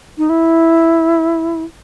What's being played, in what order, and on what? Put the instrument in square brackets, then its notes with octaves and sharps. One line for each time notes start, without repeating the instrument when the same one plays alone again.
[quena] D#4
E4